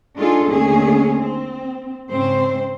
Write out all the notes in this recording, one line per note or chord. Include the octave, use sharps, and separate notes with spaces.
G#3 D4 D#4 F4 G#4 A4
D#2 D3 A3 C#4 G#4
C4
G#2 C#3 C4 C5